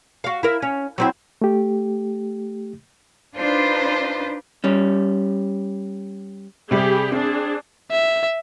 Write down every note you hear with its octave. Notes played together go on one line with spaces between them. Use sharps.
F#4 F5
E4 A#4
C#4
F#3 C4 E4
A3 G4
D4 D#4 F4 B4 C5
G3 C#4
C3 G3 G4 G#4
C4 D4 G#4
E5